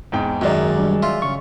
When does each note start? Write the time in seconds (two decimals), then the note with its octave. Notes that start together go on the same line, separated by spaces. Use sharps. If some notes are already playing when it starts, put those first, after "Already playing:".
0.12 E2 G#2 G5
0.41 F#2 D#3 F#3 G#3 D5
0.78 G3 D4
1.03 F4 E5 C6
1.22 C#3 C#6